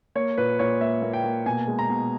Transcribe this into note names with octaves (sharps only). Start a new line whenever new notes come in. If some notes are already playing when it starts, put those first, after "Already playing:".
A#3 C#5
A#2 B4
A#2 C#5
A#3 E5
A#3
G5
A#3
B2 G#5
G#3
A#5
B2